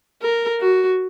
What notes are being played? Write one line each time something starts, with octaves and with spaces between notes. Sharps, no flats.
A#4
F#4